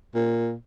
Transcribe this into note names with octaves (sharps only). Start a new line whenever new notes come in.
A#2